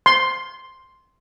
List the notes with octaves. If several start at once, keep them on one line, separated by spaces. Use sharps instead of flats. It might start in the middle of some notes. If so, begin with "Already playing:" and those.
C6